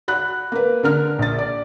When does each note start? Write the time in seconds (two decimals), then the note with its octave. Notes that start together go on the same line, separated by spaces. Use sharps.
0.08 F#4 B5 F#6
0.52 A#3 B4
0.83 D3 A#4 F6
1.19 A#1 A6
1.38 D5